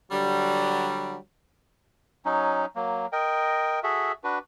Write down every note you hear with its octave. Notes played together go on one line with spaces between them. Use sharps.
D3 F#3 G3
F#3 C#4 D#4
F#3 A#3
A#4 D#5 G5
F#4 G#4 A4 E5
D4 F#4 B4